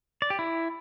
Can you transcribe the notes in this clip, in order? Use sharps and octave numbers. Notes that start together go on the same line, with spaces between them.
D5
G4
E4